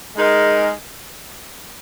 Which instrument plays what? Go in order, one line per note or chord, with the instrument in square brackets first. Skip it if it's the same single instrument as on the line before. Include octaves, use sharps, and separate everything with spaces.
[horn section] G#3 D#4 A#4